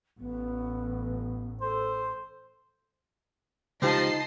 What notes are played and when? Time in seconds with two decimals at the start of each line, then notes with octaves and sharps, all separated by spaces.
0.19 A1 B3
1.61 A4 C5
3.82 C#2 F3 D#4 G4 D#5 A5 C7